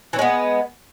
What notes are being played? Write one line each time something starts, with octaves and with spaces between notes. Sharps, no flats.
E3 G#3 B3 C#4